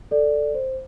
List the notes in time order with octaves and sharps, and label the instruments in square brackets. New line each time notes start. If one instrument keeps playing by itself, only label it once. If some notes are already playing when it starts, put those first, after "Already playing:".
[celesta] A4 D5
C5